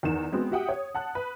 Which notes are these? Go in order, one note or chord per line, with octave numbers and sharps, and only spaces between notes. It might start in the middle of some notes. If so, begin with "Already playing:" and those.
E2 D#3 E7
G#3 B3 C4 F#4
F#4 G4 E5 F#5 G5 D#6
C#5
F#5 A5 F#6
B4